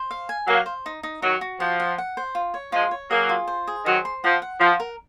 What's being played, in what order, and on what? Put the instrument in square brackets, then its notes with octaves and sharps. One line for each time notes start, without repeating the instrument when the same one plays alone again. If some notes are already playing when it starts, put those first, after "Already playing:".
Already playing: [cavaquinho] C5
F5
G#5
[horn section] F#3 A#3 [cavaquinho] F5
[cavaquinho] C5
D#4
D#4
[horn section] D#3 F#3 [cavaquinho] F#4
[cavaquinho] F#4
[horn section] F3 [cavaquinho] F#5
[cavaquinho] F#5
F#5
C5
F4
C#5
[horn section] F3 G#3 [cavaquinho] F4
[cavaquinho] C#5
[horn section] F#3 A#3 [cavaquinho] G#4
[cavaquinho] F4
C5
G#4
[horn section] D#3 F#3 [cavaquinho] C5
[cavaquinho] C6
[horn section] F3 [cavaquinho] F#5
[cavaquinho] F#5
[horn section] F3 [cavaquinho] F4
[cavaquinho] A#4